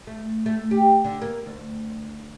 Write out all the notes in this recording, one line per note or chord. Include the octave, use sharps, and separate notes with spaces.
A3
A3
G4
D3
A#3
D2